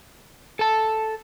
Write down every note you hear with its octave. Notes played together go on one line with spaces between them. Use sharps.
A4 A5